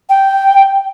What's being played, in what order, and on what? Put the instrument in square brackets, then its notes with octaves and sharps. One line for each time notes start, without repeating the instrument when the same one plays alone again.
[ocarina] G5